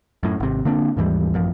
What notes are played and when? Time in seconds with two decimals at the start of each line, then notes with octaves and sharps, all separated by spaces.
0.23 F#2 A2
0.40 G#1 C3
0.65 D3 A#3 C4 D4
0.97 D#2 G#2 E3 G3
1.34 A1 F#2 F3